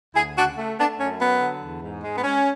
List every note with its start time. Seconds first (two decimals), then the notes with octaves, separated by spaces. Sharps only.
0.15 D2 E4 G#4
0.36 C#3 D4 F#4
0.57 A3
0.78 A3 B3 D4
0.99 F#2 C#4
1.19 F#3 B3
1.40 D3
1.61 E2
1.82 G#2
2.03 G#3
2.17 B3
2.24 G#3 C#4